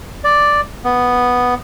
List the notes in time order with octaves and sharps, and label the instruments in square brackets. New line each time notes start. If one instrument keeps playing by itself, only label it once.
[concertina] D5
B3